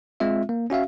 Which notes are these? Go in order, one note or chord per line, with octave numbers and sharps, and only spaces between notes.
G#3 C4 F4 E5
A#3
C#4 F#4 E5 F5